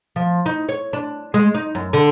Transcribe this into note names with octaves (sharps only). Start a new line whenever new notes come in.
F3
D#4
C#5
D4
G#3
D#4
F#2
D3